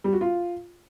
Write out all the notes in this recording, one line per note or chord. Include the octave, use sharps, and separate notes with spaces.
G3
F#4
F4